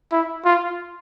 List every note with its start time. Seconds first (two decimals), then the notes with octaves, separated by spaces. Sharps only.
0.12 E4
0.45 F4